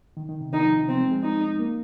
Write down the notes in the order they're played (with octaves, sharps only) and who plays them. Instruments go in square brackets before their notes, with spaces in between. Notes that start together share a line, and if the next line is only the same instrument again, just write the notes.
[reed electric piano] D#3
D#3
C3
[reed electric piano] D#3 [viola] D#4
[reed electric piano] F3
C3
[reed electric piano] F3 [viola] C4
[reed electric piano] G#3
G#3
[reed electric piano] G#3 [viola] D#4
[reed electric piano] A#3